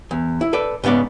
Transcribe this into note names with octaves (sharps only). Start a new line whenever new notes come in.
E2
E4
A4 B4 D5
G#2 C#3 B3 C#4 D5